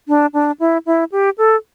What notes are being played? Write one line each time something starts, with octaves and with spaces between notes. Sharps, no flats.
D4
D4
E4
E4
G4
A4